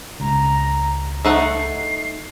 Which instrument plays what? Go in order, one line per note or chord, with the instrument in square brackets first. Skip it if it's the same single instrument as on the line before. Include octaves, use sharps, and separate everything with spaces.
[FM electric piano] C#2 [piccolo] A#5
[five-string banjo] A3 D#4 F#5 [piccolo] C7